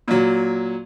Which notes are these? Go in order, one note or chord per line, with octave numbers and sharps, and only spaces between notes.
A#2 F#3